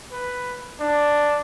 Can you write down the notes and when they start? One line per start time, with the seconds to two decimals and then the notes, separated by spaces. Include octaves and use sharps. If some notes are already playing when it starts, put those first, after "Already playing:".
0.12 B4
0.80 D4